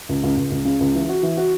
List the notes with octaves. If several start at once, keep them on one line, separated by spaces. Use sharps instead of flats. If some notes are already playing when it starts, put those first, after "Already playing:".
C#2
C#2
C#2
C#2
C#3
C#2
E3
F#4
E3
F#4